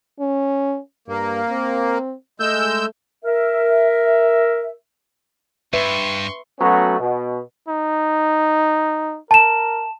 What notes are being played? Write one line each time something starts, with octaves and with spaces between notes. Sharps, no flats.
C#4
G2 A#3
C4
G#3 A3 E6 G6
A#4 E5
G2 B4 E5 C6 C#6
F#3 A3 B3 C#4 F#4
B2
D#4
A#4 A5 E7